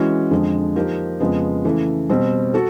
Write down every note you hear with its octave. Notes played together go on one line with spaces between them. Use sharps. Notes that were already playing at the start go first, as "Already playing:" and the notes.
Already playing: E3 G#3 C#4 F#4
F2 D3 F3 G#3
F3 A#3 D#4 G4 A#4
F2 C#3 F3 G#3 B3
C#3 E3 A3
B2 G3 C4
F#4 A4